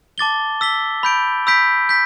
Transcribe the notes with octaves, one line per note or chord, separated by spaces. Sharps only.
A5 D6 A6 G7
E6 B6 G7
B5 G6 D7
B5 E6 G6 B6 D7
G6 B6